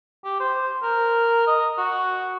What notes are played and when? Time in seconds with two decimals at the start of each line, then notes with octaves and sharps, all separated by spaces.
0.25 G4
0.40 C5
0.83 A#4
1.47 D#5
1.78 F#4